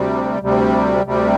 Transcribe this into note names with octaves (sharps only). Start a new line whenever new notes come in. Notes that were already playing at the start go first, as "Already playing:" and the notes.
Already playing: D2 C3 G3
D2 C3 G3
D2 C3 G3